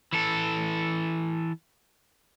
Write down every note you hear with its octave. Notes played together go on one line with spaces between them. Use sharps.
E3 A4